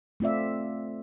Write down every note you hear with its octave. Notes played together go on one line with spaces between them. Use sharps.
A3 C4 F4 D5 E5